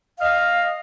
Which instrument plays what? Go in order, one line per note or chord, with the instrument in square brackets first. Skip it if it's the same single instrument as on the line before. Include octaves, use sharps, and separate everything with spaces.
[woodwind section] D#5 F5